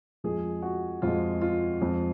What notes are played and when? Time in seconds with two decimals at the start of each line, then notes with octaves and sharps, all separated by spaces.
0.24 F2 F3 G#3 G#4
0.62 F#4
1.02 F2 F3 G#3 F4
1.42 F4
1.81 F2 F3 G#3